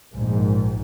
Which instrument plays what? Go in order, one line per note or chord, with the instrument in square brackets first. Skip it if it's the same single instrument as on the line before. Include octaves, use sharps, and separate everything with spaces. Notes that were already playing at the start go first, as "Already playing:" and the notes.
[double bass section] A#1 G#2